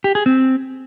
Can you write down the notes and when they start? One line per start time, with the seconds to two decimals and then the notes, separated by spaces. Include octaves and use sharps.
0.04 G4
0.15 G#4
0.26 C4